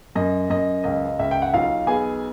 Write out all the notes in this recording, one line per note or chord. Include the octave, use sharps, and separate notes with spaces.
F#2 D#5
F#2 D#5
C#2 D#5
C#2 E5
G5
F#5
B1 F4 F5
B3 G#4 G#5